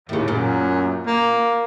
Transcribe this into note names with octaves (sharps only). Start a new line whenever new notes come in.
D#2 A2 C#3
F#2 A#2
A#3